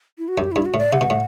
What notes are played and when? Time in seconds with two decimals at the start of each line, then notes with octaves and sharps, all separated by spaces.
0.18 E4
0.28 F#4
0.37 F#2 G4
0.52 G2 E4
0.65 F#4
0.74 A2
0.78 D5
0.93 C3 F#5
1.01 B2
1.10 A2